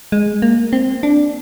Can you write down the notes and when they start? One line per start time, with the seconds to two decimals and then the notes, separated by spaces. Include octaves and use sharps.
0.12 G#3
0.42 A#3
0.73 C4
1.03 D4